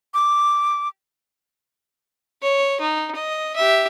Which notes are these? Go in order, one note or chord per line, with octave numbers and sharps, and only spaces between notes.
D6
C#5
D#4
D#5
G4 E5